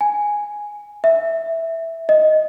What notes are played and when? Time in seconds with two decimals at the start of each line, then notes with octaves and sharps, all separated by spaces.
0.01 G#5
1.04 E5
2.09 D#5